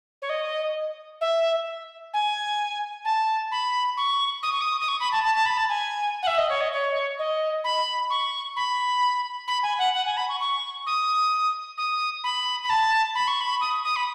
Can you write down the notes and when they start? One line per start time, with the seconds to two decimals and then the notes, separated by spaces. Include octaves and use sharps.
0.22 C#5
0.29 D#5
1.21 E5
2.13 G#5
3.04 A5
3.51 B5
3.97 C#6
4.42 D#6
4.52 C#6
4.61 D#6
4.80 D#6
4.88 C#6
5.00 B5
5.12 A5
5.23 A5
5.34 A5
5.45 B5
5.57 A5
5.69 G#5
6.22 F#5
6.27 E5
6.37 D#5
6.49 C#5
6.60 D#5
6.72 C#5
7.19 D#5
7.64 B5
8.10 C#6
8.56 B5
9.47 B5
9.63 G#5
9.78 F#5
9.94 F#5
10.05 G#5
10.17 B5
10.28 C#6
10.40 C#6
10.86 D#6
11.77 D#6
12.23 B5
12.63 B5
12.69 A5
13.15 B5
13.27 C#6
13.40 B5
13.61 D#6
13.84 D#6
13.96 B5